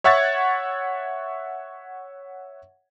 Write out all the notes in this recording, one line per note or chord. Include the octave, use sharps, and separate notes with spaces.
C#5 E5 F#5 C#6 G#6 A6